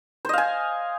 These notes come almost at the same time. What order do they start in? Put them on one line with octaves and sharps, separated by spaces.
C5 D#5 F5 G#5